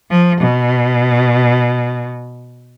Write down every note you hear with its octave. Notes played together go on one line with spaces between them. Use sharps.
F3
B2